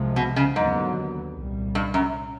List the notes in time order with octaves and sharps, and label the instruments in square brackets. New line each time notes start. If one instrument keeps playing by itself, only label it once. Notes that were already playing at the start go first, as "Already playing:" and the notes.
Already playing: [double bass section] C2 C3 F3 G#3
[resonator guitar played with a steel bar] B2
C#3
[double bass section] D#2 D3 F#3 B3 [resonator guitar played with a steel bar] G#2
[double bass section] C2 A#2 G3
[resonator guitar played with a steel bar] G2
F#2